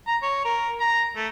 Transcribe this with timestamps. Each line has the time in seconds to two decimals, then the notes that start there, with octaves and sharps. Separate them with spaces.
0.07 A#5
0.23 C#5
0.45 A#4
0.80 A#5
1.16 A3